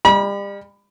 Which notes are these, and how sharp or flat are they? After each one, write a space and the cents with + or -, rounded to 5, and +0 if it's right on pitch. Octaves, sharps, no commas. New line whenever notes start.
G3 +40 B5 -40